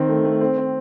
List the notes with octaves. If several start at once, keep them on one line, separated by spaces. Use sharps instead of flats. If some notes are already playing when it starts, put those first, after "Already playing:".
Already playing: D#3 C4
A3
A3
C4
C4